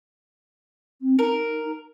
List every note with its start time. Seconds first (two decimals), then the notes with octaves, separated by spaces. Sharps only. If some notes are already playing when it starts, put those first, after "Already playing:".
1.01 C4
1.19 D#4 A#4